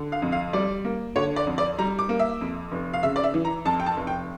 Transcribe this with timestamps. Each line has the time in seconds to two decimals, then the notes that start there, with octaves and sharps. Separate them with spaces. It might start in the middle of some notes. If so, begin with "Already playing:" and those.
Already playing: D3
0.12 F5
0.22 F2
0.32 F5
0.53 G3 D5
0.85 A#3
1.16 D3 C#5
1.36 D5
1.47 F2
1.58 D5
1.78 G3 A#5
1.99 D6
2.09 A#3
2.19 E5
2.41 F2
2.72 F1
2.93 F5
3.03 C#3 E5
3.16 D5
3.24 E5
3.34 E3
3.45 A#5
3.65 F2 A5
3.80 G5
3.86 A5
3.97 F1
4.07 G5